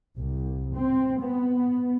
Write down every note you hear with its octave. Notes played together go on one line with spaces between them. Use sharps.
C2
C4
B3